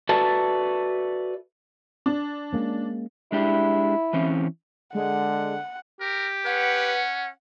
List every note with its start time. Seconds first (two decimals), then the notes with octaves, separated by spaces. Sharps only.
0.09 F#4 A4 B4 D5 E5 A5
2.06 D4
2.53 G#3 A#3 C#4
3.32 G#3 D4 E4 G4
4.13 E3 C4 C#4
4.95 D3 G#3 F#5
6.00 G4 A#4
6.46 C#4 B4 F#5